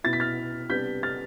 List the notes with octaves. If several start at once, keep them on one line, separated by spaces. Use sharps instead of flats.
B2 B3 E4 A6
B6
F6 A6
C3 G3 B3 D4 G6 B6
F6 A6